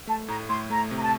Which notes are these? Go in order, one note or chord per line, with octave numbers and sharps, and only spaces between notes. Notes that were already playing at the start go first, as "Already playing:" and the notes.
A3 A5
A2 A#5
A2 C6
A3 A#5
C3
A#5
A5